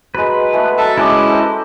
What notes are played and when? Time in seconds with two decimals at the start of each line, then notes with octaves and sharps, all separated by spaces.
0.15 F#3 G#3 B4
0.53 G#3 A3 B3
0.78 F#3 A4 E5 A5
0.98 G#3 C#4 E4 B4 D#5 D6
1.28 A4 C5